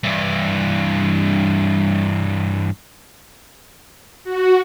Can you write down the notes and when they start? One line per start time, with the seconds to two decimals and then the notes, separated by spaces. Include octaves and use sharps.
0.04 G2 E3
4.24 F#4